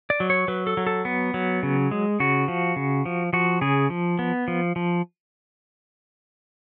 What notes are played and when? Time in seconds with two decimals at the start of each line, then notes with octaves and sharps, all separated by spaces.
0.10 D5
0.20 F#3
0.30 C#5
0.48 F#3 B4
0.67 A4
0.77 F#3
0.87 A4
1.05 B3
1.34 F#3
1.63 C#3
1.91 G#3
2.20 C#3 F#4
2.48 F3
2.76 C#3
3.06 F3
3.33 F3 F#4
3.61 C#3 G#4
3.90 F3
4.19 B3
4.48 F3
4.76 F3